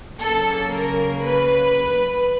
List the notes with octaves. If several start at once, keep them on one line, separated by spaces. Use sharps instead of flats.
C#3 F#3 A#3 A4
A#4
B4